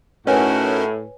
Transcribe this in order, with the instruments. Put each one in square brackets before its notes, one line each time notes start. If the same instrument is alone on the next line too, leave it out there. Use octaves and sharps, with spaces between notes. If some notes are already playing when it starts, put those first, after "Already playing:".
[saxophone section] A2 [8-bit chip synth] C#4 A#4 [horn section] D#4 F#4 [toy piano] B4 C#5 G#5